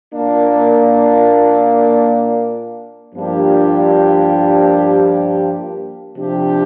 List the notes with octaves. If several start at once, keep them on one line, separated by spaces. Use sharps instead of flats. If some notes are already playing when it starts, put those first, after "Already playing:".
A#2 A#3 D4
G2 F3 A#3 D4 G4
C3 F3 D4 G4